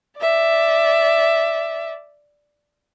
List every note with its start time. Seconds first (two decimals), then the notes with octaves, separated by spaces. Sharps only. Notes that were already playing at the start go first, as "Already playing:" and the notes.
0.18 D5 E5